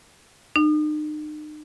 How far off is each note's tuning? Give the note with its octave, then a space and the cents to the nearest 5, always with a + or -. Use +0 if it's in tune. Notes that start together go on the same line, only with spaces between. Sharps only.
D#4 -40